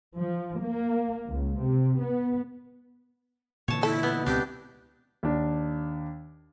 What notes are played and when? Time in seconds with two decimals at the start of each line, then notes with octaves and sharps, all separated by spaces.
0.18 F3
0.63 A#3
1.32 C#2
1.62 C3
2.03 B3
3.68 A#2 D3 E3 C#5 A5
3.83 E4 A4
4.03 B2 B3
4.26 C#2 B2 C4 D4 G4
5.23 D#2 D4